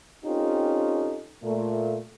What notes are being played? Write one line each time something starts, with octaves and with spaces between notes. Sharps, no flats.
C4 C#4 D#4 F4 G4 A4
A#2 A3